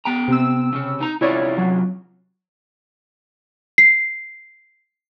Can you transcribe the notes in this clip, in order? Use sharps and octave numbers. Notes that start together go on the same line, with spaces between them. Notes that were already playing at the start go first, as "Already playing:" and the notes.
B3 G5 A#5
C3 C4 E6
C#3 C#4
D#4 A#5
C3 C#4 E4 F4 C#5 D5
F#3
C7